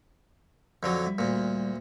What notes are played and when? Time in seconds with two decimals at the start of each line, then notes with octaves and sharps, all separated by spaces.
0.83 F2 D3 F#3
1.06 G3 E5
1.18 D2 A#2